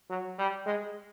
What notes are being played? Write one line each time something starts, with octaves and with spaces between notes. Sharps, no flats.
F#3
G3
G#3